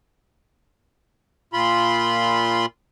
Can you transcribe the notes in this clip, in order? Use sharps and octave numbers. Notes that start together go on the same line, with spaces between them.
A#2 F4 B5 C6